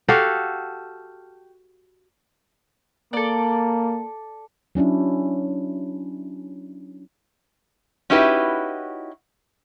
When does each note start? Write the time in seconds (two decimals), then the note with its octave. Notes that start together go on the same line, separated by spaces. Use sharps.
0.08 F#4 G4 A4 F5
3.13 A#3 A4 D5
4.75 F#3 C#4 D4 E4
8.10 C#4 D#4 E4 F#4 G4 B4